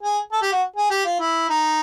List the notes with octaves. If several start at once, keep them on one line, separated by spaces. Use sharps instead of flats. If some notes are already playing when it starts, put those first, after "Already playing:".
G#4
A4
G4
F#4
G#4
G4
F4
E4
D#4